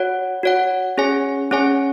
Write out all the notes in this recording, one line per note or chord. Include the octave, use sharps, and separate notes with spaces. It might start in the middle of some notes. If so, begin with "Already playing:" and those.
Already playing: F#4 C#5 F#5
F#4 C#5 F#5
C#4 G#4 C#5 G#5
C#4 G#4 C#5 G#5